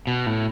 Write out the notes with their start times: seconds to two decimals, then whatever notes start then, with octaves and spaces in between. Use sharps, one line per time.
0.07 B2
0.26 A2